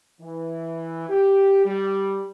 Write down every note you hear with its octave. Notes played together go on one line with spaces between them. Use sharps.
E3
G4
G3